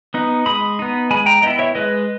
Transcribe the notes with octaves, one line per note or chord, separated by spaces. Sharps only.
B3 D#4
G#3 B5 D#6
B3 D#4
G#3 G#5 B5
G5 A#5
B3 E4 D#5 G5
C#5 E5
G#3 B4 D#5